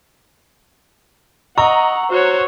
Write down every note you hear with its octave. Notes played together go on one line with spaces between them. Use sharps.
D#5 F#5 A#5 C#6 E6
F#4 C5 C#5